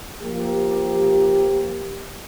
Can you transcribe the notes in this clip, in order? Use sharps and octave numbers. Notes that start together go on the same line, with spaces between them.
F3 A#3 G4